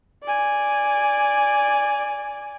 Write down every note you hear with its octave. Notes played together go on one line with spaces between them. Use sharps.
D5 G#5